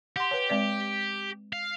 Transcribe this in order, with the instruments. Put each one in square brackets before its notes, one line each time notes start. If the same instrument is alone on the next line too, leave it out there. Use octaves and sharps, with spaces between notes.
[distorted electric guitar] G4 [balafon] F#5 C6
[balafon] B4 C#5
G#3 C4 D5
[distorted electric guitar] F5